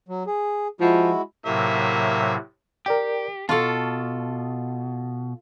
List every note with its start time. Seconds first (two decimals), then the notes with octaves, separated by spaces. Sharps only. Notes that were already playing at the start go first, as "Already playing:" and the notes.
0.08 F#3
0.27 G#4
0.81 F3 G#3 E4 F#4
1.46 A2 C3 F#3 A#3 E5
2.86 G4 A#4 D5 G5
3.49 B2 F4 A4 A5 C#6 F6